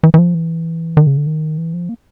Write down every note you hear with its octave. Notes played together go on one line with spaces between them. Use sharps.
E3
E3
F3
E3
D#3
C#3
D3
D#3
E3
F3
A#3